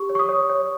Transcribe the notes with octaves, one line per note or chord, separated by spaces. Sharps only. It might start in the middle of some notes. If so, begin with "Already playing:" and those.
Already playing: G4 C#6
C#5
C#6
D#6
C#5
C#5